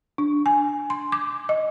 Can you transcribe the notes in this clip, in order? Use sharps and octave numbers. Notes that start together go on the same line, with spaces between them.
D4
G#5
C6
D6
D#5